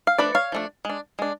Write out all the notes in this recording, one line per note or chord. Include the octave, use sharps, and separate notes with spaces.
F5
F3 A3 D4 B4 D5
C#5 F5
F3 A3 D4
G#3 D4
G#3 D4